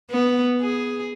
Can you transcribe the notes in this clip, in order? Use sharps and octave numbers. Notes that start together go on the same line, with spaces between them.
B3
G#4